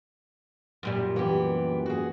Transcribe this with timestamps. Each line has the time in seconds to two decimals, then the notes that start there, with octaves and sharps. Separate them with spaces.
0.83 F#2 A#2 G3
1.16 E3 B3 G4
1.86 F#4 G#4